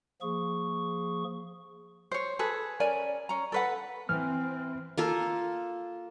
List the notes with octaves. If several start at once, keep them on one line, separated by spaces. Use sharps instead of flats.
F3 A#3 G#4 C#6
C5 C#5
G#4 A4 B4
C#4 A#4 D5 G#5
C#4 A#5
A4 B4 F#5
E3 C4 F6
A#3 F4 A4